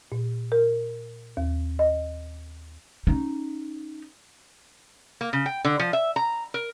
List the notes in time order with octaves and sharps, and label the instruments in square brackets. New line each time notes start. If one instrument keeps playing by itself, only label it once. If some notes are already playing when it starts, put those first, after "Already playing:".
[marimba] A#2
A#4
D#2
D#5
[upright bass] C#4 D#4
[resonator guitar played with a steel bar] A#3
C#3
G5
D3
F3
E5
A#5
A#4